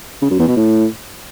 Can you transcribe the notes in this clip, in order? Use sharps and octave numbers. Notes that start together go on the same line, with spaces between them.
C#3
F#2
E2
B2
A2